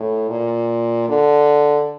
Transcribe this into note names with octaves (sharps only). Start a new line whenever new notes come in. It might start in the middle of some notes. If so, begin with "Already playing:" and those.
Already playing: A2
A#2
D3